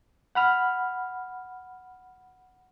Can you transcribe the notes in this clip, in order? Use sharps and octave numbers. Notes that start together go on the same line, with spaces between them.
F#5 B5 F6